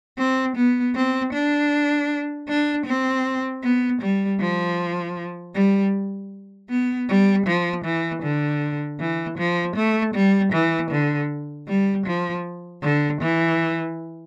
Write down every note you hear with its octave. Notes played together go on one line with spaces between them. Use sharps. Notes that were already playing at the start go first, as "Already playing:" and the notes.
C4
B3
C4
D4
D4
C4
B3
G3
F3
G3
B3
G3
F3
E3
D3
E3
F3
A3
G3
E3
D3
G3
F3
D3
E3